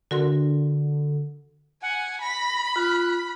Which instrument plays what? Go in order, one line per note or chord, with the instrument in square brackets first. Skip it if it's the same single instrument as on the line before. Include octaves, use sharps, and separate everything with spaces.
[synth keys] D3 [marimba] F#4 A#4 C6
[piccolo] F#5 [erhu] G#5
[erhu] B5 [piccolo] A#6
[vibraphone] F4 [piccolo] F#6